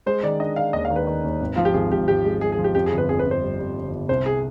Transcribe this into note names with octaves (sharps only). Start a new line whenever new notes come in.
G#3 C5
D#3 D5
D4 D#5
D4 F5
D#2 D#5
F5
D#3
B4
D#3
D#2
G#1
F3 F4
G4
G#1 G#4
G#1 G4
G#1 G4
G#3
G#3 G#4
G#4
F3
G4
F2 G4
G#4
G1
B4
F2 G#4
B4
F2
C5
G3
G3
G1
G1
C2 C5
G#4